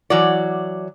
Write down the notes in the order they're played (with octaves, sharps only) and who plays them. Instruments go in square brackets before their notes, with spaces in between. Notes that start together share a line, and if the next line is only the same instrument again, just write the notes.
[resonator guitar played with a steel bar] E3 F#3 D5